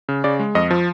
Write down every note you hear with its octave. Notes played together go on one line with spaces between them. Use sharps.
C#3
C#3 D5
G#3
F2 D#5
F3